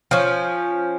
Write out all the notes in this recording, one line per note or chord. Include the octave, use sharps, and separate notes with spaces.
F3 C#4